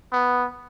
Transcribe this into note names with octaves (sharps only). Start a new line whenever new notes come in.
B3